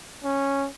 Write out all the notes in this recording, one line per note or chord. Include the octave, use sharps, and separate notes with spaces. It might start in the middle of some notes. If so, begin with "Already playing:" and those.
C#4